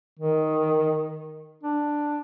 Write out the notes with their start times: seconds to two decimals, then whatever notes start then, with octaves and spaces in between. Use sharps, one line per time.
0.19 D#3
1.63 D4